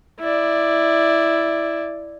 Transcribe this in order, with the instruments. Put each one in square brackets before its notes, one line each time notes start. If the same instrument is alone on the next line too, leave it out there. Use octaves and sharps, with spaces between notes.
[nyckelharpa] E4 D5